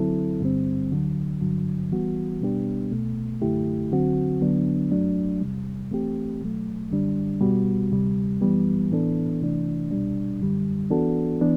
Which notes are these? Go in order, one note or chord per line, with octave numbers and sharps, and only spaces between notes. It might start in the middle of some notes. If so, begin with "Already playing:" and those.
Already playing: D3 F#3 C4 E4 A4
G2 D3 G3 C4
D2 D3 F#3
G2 D3 F#3
E3 G3 B3 F#4
B2 G3 B3 D4 G4
C2 B2 A3
F#2 D3 A3 E4 G4
D3 F#3 C4 F#4
D3 F#3 B3 D4
F#2 F#3 A3 D4
E2 C3 G3
E3 A3 C4 G4
B2 F#3 A3
F#2 D3 G3 D4
B2 G3 B3 F#4
D2 C3 G3
F#2 E3 G3 B3
A2 E3 B3 D4 A4
C3 E3 A3 D4
C2 B2 G3 D4
F#2 D3 G3
E3 B3 D4 F#4 A4
E3 B3 D4